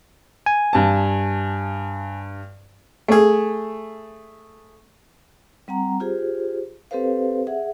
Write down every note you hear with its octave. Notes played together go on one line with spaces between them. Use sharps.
G#5
G2 A5
A3 G#4
G3 C4 F#5 A#5
F4 G4 G#4 C5
C4 G4 A4 B4 C5 F5
G#4 E5 F#5